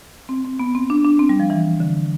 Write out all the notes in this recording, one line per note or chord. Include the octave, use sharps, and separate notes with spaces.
C4
C4
B3
C4
D4
D4
C4
G3
F3
E3
D3